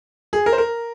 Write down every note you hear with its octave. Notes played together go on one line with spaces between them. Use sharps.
G#4
A#4
C5
A#4